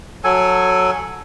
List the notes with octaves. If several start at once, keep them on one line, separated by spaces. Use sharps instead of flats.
F#3 A4 G#5